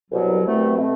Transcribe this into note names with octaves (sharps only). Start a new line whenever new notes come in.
C2 B2 F#3
C2 B2 A3 C4
B2 A3 C4